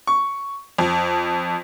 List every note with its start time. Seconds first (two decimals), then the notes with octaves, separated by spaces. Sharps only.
0.07 C#6
0.78 F2